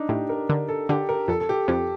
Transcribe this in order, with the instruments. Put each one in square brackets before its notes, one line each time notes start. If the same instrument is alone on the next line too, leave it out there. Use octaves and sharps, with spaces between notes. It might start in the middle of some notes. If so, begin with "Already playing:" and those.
Already playing: [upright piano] D4 D#4
[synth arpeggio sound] A2 [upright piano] G4
[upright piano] A#4
[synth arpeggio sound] D3 [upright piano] A#4
[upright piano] A4
[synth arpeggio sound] D3 [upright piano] G4
[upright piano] A#4
[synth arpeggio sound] F2 [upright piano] A4
[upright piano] A4
G4
[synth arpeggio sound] F2 [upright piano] G4